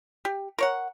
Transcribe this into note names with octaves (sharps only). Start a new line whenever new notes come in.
G4
A#4 C#5 F#5